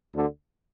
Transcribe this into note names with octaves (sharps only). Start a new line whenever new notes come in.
D2 D3